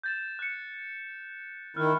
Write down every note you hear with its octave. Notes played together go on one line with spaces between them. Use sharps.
G6 A6 E7
F#6 C#7
D#3 E4 F6 F#6